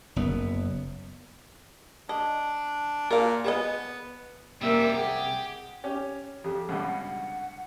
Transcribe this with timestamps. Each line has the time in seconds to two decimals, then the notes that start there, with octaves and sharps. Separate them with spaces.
0.16 F#1 B3
2.09 D4 D#5
3.11 A#2 A#4 F5
3.44 B3 G#4 D#5
4.61 C2 F#2 C3 G3 A#3 A#4 E5
4.95 G4 G#4 F#5
5.84 C#4 G4
6.44 F2 G4
6.69 C#2 G2 B2 F#5